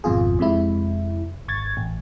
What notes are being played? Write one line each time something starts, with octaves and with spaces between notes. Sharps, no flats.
G#1 F2 B2 F4 G#4
F2 C3 G#3 E4
G#1 C#6 G#6 A6
A1